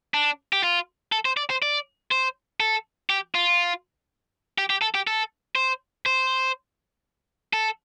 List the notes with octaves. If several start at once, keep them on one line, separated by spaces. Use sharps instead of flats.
D4
G4
F4
A4
C5
D5
C5
D5
C5
A4
G4
F4
G4
G4
A4
G4
A4
C5
C5
A4